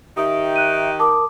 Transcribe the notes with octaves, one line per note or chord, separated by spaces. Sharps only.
D#3 D#4 G4 E5 D#6
F#6 D#7
A#4 A5 D6 D#6